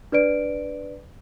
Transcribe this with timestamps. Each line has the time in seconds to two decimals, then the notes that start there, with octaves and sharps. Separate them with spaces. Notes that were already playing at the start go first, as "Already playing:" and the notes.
0.12 D4 B4 D5 D7